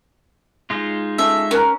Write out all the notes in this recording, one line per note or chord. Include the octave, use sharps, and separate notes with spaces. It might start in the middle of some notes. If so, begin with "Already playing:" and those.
G#3 D#4 F4
C#4 A4 E5
C#4 A#4 B4 A#5